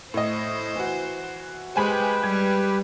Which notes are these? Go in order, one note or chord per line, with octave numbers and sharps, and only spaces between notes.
A2 C5 D#5
E3 F#4
G#3 G4 B4 C5 G5 G#5 B5
G3 G#6